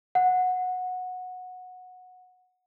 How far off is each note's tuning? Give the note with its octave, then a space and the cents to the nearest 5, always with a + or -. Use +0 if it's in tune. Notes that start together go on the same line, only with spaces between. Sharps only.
F#5 -15